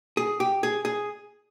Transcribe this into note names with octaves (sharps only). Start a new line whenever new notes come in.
G#4
G4
G#4
G#4